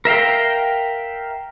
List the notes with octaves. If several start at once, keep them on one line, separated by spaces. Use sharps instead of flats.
A#4 E5 F5 G5